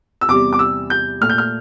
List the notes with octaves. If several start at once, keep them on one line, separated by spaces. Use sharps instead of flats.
E6
E2 C3 G3 D6
D6
E6
G6
A#2 A3 F6
G6
F6